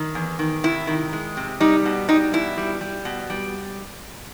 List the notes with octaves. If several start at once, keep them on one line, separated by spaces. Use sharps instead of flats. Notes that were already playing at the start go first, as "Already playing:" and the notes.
Already playing: D#3
E2
D#3
C3 E4
D#3
G#3
C3
G3 D#4
B2
G3 D#4
B2 E4
G3
G3
B2
G3